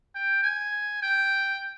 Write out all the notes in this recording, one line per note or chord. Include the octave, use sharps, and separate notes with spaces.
G5
G#5
G5